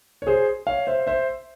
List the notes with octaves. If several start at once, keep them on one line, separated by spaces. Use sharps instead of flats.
C#5
G#4 C5
C#5 F5
C5 E5
C5 E5